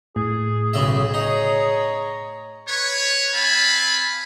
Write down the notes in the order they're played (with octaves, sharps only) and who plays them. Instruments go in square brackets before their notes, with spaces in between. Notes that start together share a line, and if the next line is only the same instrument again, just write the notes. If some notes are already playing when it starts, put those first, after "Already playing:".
[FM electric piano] A2 [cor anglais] G#4
[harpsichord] B1 C#3 E5
[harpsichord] D#4 [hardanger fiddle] C#5 A#5
[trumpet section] B4 C#5
C4 F5 G#5 A5 B5